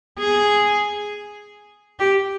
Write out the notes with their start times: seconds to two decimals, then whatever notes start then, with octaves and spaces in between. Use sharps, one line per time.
0.19 G#4
1.99 G4